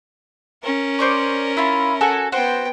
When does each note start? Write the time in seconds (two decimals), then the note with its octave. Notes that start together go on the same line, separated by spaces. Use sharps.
0.63 C#4 A#4
0.99 C5 D5 C#6
1.57 E4 F4
2.01 F#4 A4 G#5
2.32 B3 F#4 C5 G5